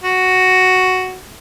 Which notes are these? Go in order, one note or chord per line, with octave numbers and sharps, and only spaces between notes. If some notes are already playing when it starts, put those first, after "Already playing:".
F#4